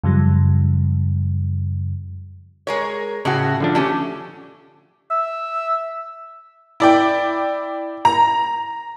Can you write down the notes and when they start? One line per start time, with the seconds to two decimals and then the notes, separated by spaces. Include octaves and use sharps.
0.04 F#2 C#3 F3 G3
2.67 G#3 A#4 C#5
3.25 A2 C#3 C#4 F#4
3.60 D3 F3 D4
3.75 A3 C#4 G4
5.11 E5
6.80 E4 D5 G5
8.05 A#5